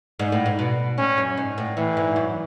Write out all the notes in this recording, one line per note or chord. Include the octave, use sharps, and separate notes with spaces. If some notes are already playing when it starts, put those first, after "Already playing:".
G#2
A2
G#2
B2
A2 C#4
F#2
G#2
A2
A2 E3
G#2
F#2